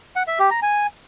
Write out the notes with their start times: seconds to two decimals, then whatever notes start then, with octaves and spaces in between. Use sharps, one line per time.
0.16 F#5
0.27 E5
0.39 G4
0.51 A#5
0.62 G#5